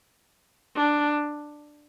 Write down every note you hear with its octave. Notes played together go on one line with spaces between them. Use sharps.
D4